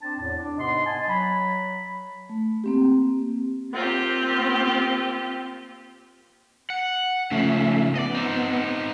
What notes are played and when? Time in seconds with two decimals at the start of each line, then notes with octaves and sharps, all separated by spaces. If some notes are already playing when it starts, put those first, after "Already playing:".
0.02 C4 D4 A5
0.20 E2 A2
0.37 D4
0.58 G#2 C3 B3 D#5 C6
0.85 D#5 G#5 A5
1.08 F#3 B5
2.29 A3
2.64 A#3 C4 G4
3.71 A#3 C4 F4 G4
6.70 F#5
7.31 C#3 F3 A3 C#4 E5
7.96 B3 D5 D#5
8.15 C4 D#4